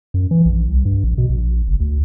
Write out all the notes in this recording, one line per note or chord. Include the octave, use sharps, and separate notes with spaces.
F#2
E3
A#1
C2
G2
A#1
B2
A#1
F#1
D2